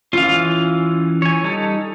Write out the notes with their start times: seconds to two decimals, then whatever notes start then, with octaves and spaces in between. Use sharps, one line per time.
0.13 E3 C#4 F4 F5
1.22 C#5 G#5
1.44 G3 D#4 A4